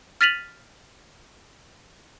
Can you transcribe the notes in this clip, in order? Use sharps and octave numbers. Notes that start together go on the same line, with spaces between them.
F6 A6 B6 D#7 F7 F#7